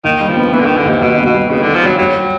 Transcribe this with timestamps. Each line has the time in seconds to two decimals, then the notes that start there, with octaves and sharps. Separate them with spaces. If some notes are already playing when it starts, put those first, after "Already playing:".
0.04 D#2 D#3
0.20 G3
0.29 F3
0.37 B3
0.53 E3 B3
0.60 D3
0.65 D#3 B3
0.77 D3
0.85 D#2 C3
1.01 D#2 B2
1.17 B3
1.25 B2
1.34 G3
1.50 C#3 B3
1.62 D3 D#3
1.74 F3
1.82 F#3 G3
1.98 F#3 G3